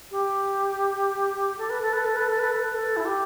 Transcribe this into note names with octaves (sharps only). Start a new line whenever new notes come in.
G4
A4
B4
A4
B4
A4
B4
A4
B4
A4
B4
A4
E4
G4